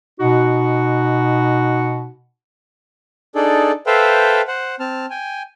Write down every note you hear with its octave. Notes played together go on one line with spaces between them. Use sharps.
B2 D#4 F#4 F#5
D4 D#4 G#4 A4 D5
A4 B4 C5 E5 F5 G5
C5 F#5
C4 A5 F6
G5 G#5